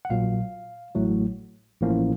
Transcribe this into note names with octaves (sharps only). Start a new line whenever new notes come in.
F#5
A#1 A#2 F#3 F5
A1 A2 F#3 A3
A1 A2 F3 A#3 C#4